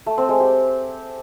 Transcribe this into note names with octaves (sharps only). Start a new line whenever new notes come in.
A3
C4
G#3
G4